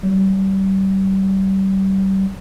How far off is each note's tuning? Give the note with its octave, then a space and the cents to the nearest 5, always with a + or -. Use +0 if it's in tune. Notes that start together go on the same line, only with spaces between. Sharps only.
G3 -30